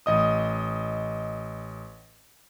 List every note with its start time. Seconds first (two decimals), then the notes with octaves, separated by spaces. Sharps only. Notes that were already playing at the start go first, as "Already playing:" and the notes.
0.06 A1 D#5 D#6